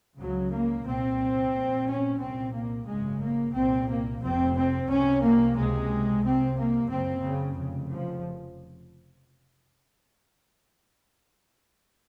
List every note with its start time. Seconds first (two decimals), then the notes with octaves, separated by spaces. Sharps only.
0.19 C#2 C#3 F#3
0.52 A#3
0.86 C2 A#2 C4
1.53 A#1 A#2
1.87 C#4
2.20 C2 A#2 C4
2.54 A#3
2.87 G#1 F#2 C#3 G#3
3.21 A#3
3.54 C2 A#2 C4
3.88 A#3
4.22 F1 F2 C3 C4
4.55 C4
4.88 C2 C3 C#4
5.22 A#3
5.56 C#2 C3 G#3
6.23 C2 C3 C4
6.57 A#3
6.90 F#1 F#2 C#3 C4
7.24 C#3
7.57 F1 F2 C#3
7.91 F3